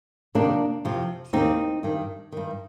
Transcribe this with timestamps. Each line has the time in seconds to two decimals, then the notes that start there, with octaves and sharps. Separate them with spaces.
0.35 F2 C3 D#3 A#3 D4
0.85 F2 C3 F3
1.33 D#2 D#3 C4 D#4
1.83 G2 D#3
2.32 G2 D#3